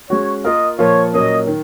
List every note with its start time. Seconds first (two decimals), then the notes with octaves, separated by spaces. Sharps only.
0.10 G#3 C#4 F#4 C#5
0.44 A#3 F4 A#4 D#5 F5
0.79 A#2 F3 A#3 F4 A#4 C#5
1.13 A#2 F#3 A#3 C#4 D#5
1.47 D#3